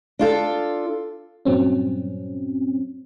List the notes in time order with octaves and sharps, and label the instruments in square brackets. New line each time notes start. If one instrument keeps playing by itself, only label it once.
[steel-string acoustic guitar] D4 F4 A4
[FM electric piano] G2 A#2 F#3 C4 C#4